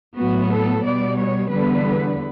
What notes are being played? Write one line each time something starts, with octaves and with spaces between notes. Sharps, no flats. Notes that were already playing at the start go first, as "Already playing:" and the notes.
A2 F#3 B3 F#4
A4
B2 G3 B3 D5
C#5
E2 D3 G3 B3 B4